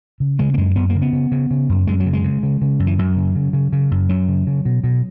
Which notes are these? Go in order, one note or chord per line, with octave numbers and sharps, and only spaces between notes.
C#3
C#3 G#3
A#3
F#2 G#3
F#2 B3
A#3
C#3
B3
C#3
C#3
C#3
F#2
F#2 G#3
F#3
C#3
G#3
C#3
C#3
C#3
F#2
E3
F#2 F#3
C#3
C#3
C#3
C#3
F#2
F#2 F#3
C#3
C#3
B2
B2